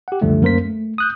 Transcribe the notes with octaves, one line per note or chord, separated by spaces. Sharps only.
G4 F#5
C#2 F#2 D3 F3 G3 A3
F#2 A#3 A#4 C5 B6
A3
D#6 F#6 G6